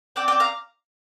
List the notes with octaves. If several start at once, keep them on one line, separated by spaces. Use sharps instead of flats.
C4 D5 G5
D5 G5
C4
F5 A#5